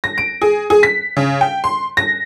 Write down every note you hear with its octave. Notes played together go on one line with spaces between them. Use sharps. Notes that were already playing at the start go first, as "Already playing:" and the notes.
A#6
D7
G#4
G#4
B6
C#3
G5
C6
A#6